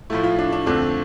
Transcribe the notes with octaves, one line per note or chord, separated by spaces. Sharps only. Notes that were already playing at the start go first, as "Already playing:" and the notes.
A2 F3 A3 E4
F4
D4
D4
F2 D3 A3 C4 D4